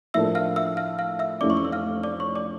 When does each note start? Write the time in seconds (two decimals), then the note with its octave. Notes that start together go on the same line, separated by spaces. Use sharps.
0.14 A2 F3 A#3 D4 A4 E5 E6
0.35 F5 F6
0.56 E5 E6
0.77 F5 F6
0.99 F5 F6
1.19 E5 E6
1.41 F1 F2 E3 A3 C#4 D5 D6
1.50 C#6
1.57 D6
1.65 E6
1.72 F5 F6
2.03 D5 D6
2.20 C#5 C#6
2.35 D5 D6